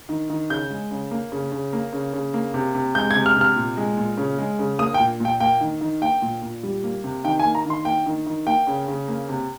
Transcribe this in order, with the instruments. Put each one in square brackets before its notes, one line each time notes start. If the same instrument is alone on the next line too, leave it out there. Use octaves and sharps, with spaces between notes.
[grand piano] D#3
D#3
C#3 G6
G#3
C#3
A#3
C#3
C#3
A#3
C#3
C#3
A#3
C3
C3
G#3 G6
G#6
C3
F6
C3
F6
A#2
G#3
A#2
C#3
G#3
C#3
A#3 D#6
G5
A#2
A#2 G5
A#3 G5
D#3
D#3
A#3 G5
A#2
A#2
G3
A#3
C3
D#3 G5
G#5
A#3
A#5
D#3
C6
A#3 G5
D#3
D#3
A#3 G5
C#3
C#3
A#3
C3